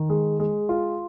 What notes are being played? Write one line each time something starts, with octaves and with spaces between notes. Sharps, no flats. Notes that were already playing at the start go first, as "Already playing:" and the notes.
Already playing: D#3
G#3
G#3
F4